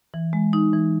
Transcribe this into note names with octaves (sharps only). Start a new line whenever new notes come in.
E3
G#3
D#4
E3